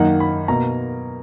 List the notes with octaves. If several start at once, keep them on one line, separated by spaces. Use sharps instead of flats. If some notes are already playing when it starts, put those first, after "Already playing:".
Already playing: F#2 D#3 A#3 D#4 F#5
B5
B2 A#3 A#5